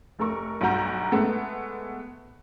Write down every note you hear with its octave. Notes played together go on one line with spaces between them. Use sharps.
F1 A3 A#4 C#6
B1 G2 F#4 A#5 G6
G#3 A3 B3